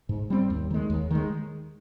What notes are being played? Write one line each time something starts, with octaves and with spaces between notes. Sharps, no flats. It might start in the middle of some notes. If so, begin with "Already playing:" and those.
G#2
G3 C4
D#2
D#3 G#3
D#2
D#3 G#3